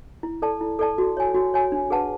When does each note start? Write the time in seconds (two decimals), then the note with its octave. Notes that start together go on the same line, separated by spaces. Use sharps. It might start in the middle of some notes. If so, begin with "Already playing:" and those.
0.23 E4
0.42 A4 D5 A5
0.61 E4
0.79 A4 D5 A5
0.98 F#4
1.17 C#5 G#5
1.34 F#4
1.54 C#5 G#5
1.72 D4
1.90 G#4 B4 F#5 A5